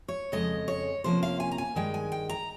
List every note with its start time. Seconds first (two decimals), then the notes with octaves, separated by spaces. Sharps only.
0.08 C#5
0.32 F2 C#3 G#3 D#5
0.68 C#5
1.04 C3 F3 A#3 C#4 C5
1.23 F5
1.40 G#5
1.51 A#5
1.58 G#5
1.75 G2 D#3 G#3 G5
1.94 G#5
2.12 G5
2.29 A#5